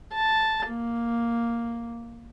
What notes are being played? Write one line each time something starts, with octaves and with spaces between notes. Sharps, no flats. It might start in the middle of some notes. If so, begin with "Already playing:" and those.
A5
A#3